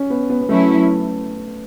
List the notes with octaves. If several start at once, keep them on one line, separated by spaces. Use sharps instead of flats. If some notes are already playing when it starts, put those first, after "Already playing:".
Already playing: C#4
B3
B3
B3
F#3 A3 C#4 E4